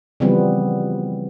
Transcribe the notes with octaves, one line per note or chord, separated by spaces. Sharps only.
C#3 E3 F3 G3 B3 C4